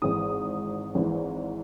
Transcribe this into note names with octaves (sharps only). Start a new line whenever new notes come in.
G#1 G#2 E3 D#6
G#1 G#2 E3